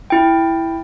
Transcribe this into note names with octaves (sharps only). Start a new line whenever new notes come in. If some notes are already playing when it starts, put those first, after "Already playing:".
E4 G5